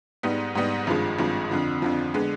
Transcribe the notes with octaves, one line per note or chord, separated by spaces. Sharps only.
G#2 G3 B3 D#4
G#2 G3 B3 D#4
G#1 G2 F3 G#3
G#1 G2 F3 G#3
F2 D3 F3
F2 D3 F3
D3 G#3 B3